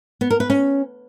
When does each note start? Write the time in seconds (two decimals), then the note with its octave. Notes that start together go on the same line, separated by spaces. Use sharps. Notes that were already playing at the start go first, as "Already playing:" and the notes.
0.21 B3
0.30 A#4
0.40 B4
0.50 C#4